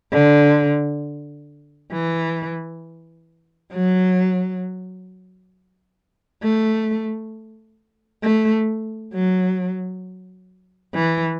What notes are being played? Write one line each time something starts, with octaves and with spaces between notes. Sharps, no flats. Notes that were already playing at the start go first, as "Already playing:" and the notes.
D3
E3
F#3
A3
A3
F#3
E3